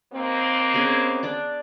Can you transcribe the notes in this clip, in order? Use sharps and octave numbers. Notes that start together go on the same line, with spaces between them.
D#2 A#3 C4
B3 C#4 G#4
D4 D5